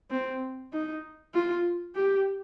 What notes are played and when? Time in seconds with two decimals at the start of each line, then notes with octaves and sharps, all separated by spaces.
0.11 C4
0.73 D#4
1.34 F4
1.96 G4